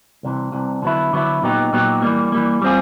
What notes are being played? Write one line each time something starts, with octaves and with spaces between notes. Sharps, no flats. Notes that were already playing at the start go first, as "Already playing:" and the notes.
C2 C3 E3
C2 C3 E3
D3 F#3 B3 E4
D3 F#3 B3 E4
A#2 F#3 B3 D#4 G4
A#2 F#3 B3 D#4 G4
E3 G3 A#3
E3 G3 A#3
G3 C4 F4 G#4